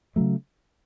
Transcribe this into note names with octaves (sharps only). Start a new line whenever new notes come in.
C#3 F#3 A3